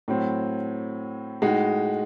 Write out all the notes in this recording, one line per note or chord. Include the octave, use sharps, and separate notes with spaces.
A2 F#3 C4
A2 G#3 D#4 F#4